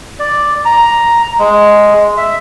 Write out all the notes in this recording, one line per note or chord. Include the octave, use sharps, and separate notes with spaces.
D5
A#5
G#3
E5